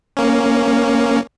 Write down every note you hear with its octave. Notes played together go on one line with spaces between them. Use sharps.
A#3 C#4